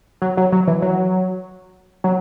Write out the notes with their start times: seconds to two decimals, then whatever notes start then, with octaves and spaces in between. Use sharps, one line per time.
0.22 F#3
0.37 F#3
0.52 F#3
0.67 E3
0.82 F#3
2.04 F#3